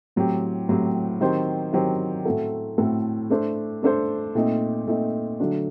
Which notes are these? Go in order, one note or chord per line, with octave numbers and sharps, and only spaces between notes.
A2 F#3 C4 G4
A2 F#3 C4 G4
D#3 F#3 C4 G4 C5
D#3 F#3 C4 G4 C5
A2 A3 C4 F#4 A4
A2 A3 C4 F#4 A4
A3 D4 A4 C5
A3 D4 A4 C5
A#2 A3 C4 D#4
A#2 A3 C4 D#4
D3 F#3 A3 D4 F#4